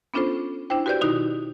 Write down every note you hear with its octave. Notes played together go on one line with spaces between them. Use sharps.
B3 C#4 D4 F4 A4 C5
D4 E4 C5 G5
F#4 G4 B4 C5 D5 G6
B2 D#3 D#4 E4 F#4